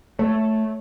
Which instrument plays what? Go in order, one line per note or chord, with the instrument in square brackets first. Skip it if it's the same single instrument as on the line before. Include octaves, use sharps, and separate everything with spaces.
[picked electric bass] A3 [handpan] C#5